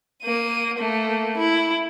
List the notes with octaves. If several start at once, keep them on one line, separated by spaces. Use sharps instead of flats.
A#3 D#7
A3 A#3
E4